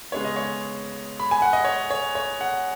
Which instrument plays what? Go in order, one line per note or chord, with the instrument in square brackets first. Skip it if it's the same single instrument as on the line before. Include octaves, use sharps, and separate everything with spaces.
[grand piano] C#3 G#3 B3 C#5
D#5
C#5
B5
G#5
F#5
D#5
C#5
C#5
C#5
F#5